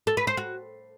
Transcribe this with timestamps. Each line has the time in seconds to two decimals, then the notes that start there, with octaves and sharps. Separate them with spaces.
0.07 A4
0.17 B4
0.27 C5
0.37 F#4